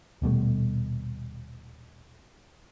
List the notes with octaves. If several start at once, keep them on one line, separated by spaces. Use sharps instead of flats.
D#1 B2 G3 A3